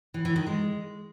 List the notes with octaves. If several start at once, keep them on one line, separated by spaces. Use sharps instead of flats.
E3
E3
D#3
G#3